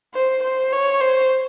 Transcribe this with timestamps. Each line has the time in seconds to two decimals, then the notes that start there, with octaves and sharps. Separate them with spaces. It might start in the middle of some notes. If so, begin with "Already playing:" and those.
0.14 C5
0.44 C5
0.73 C#5
1.01 C5